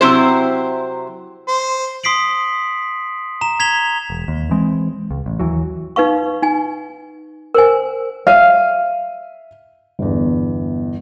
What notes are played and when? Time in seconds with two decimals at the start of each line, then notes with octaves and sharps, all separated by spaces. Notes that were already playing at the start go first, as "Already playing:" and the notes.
0.01 C3 F#3 C4 E4 G4 C5
1.48 C5
2.04 C6 D#6 B6 C7 D7 F#7
3.41 A#5 E7
3.60 G#6 B6 F7 G7
4.10 E1
4.28 D#2
4.51 E3 G#3 C4
5.11 C#2
5.26 A1
5.40 D#2 E3 F#3
5.96 D#4 B4 F5 C#6
6.43 D#4 G#5
7.55 A#4 C5 G#5
8.27 E5 F5 D#7
9.99 G1 E2